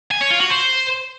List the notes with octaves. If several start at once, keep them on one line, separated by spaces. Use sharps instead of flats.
G#5
C#5
F4
F#4
C5